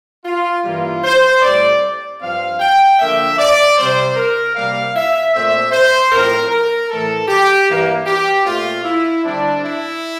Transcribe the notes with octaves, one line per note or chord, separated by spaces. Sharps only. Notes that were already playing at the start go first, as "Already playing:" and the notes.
F4
G2 E3 G3 A#3 F4
C5
A2 G3 C4 D5
G2 F3 C4 F5
G5
D3 F3 A#3 E5
D5
C3 G3 C4 C5
A#4
C3 G3 A#3 F5
E5
A#2 A3 C4 E5
C5
A2 F3 C4 A#4
A#4
A2 E3 A3 A4
G4
G2 E3 A#3
G4
A#2 A3 C4 F4
E4
D3 G3 C4 D4
E4